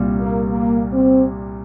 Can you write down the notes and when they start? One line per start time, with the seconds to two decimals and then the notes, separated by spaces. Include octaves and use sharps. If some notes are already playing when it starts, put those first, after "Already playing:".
Already playing: C2 A#2 G3
0.19 A#3
0.49 A#3
0.93 C4